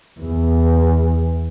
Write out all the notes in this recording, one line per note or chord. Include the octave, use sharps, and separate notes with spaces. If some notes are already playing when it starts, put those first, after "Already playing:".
E2